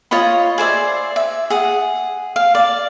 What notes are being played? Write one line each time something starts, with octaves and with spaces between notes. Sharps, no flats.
F4 C#5 D#5 B5
G#4 C5 D5 E5
E5
G#4 F#5
F5
D5